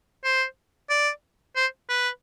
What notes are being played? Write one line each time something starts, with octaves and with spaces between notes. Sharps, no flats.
C5
D5
C5
B4